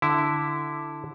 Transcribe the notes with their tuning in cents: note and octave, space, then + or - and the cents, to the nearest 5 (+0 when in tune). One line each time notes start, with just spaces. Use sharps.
D3 +0 E4 +0